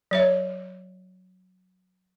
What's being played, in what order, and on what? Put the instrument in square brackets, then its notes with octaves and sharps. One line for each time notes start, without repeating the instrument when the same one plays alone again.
[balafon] F#3 C#5 E5